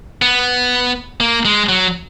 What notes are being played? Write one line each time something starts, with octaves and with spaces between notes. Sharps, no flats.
B3
A#3
G#3
F#3